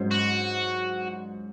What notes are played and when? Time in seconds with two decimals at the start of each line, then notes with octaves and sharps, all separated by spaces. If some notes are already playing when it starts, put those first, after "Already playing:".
Already playing: G#2 F#3 C#4 C5
0.11 F#4